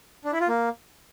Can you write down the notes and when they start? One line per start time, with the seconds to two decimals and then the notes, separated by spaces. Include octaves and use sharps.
0.25 D4
0.32 E4
0.40 F4
0.48 A#3